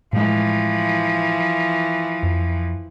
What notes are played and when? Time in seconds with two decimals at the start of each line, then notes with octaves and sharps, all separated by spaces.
0.13 A2 E3 F3 G#3
2.23 F2